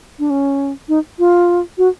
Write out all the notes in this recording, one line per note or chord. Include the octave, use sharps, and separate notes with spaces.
D4
C#4
D#4
F4
F#4